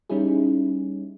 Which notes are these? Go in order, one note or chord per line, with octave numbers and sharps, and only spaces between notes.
G3 C#4 D#4 E4 G#4